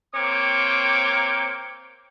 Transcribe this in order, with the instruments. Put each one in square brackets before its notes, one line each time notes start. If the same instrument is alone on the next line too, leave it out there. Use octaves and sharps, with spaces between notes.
[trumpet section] A#3 C4 C#5 G5 D6